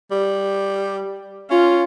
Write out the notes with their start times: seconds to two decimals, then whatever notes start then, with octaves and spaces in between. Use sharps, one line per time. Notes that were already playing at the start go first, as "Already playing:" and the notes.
0.11 G3
1.50 C#4 F4